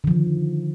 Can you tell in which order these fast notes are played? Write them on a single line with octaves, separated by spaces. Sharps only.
D3 F3 D#3